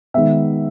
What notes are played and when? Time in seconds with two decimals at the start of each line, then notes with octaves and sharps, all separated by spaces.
0.14 D#3 G#3 B3 E5